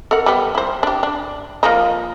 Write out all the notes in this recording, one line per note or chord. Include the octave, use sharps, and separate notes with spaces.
A4 A#4 F#5
G3 B3 G4
E4 C5
D4 G4
D4
F3 A#3 D#4